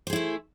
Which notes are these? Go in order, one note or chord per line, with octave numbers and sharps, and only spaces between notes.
A3 E4 G#4 C5